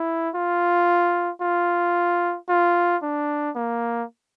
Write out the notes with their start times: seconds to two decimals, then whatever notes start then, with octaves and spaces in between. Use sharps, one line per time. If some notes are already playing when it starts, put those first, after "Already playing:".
Already playing: E4
0.35 F4
1.41 F4
2.49 F4
3.03 D4
3.56 A#3